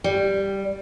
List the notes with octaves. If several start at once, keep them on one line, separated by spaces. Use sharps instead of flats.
G3